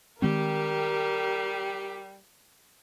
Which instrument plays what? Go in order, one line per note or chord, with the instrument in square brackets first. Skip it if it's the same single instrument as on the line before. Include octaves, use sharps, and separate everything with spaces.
[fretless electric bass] D#3 G#3 C4 [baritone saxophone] G3 [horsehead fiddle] G4 [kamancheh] A#4